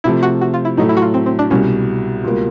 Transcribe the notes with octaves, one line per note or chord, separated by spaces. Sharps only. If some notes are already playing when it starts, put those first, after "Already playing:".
C3 F3 A3 E4
F#4
F#4
F4
E4
A2 F#3 A3 D#4
E4
F#4
F4
C4
C4
D4
C2 B2 G3 C#4
C#2 B2 G3 A#3